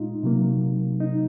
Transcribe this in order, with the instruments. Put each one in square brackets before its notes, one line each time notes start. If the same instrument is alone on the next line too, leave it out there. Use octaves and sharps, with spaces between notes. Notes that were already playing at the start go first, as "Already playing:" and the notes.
Already playing: [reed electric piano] A#2 G#3 D#4 F4
C3 F#3 A#3
D#4